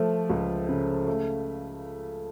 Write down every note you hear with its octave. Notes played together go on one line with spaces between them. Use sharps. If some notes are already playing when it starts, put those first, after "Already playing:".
Already playing: F3 A3
C#2
C#3
A3